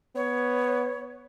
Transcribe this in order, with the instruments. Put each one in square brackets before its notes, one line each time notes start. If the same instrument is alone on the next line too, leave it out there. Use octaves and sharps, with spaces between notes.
[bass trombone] B3 [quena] C#5